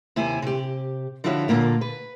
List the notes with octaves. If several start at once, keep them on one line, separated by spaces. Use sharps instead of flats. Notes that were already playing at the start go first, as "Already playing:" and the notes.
D#2 C3 E4 G#5
C3 G4
D3 F3 D4 E4 F#4 C#5
A#2 D3 A#3 F4
B4